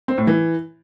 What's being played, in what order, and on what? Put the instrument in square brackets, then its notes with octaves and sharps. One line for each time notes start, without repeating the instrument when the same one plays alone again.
[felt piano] C4
A2
E3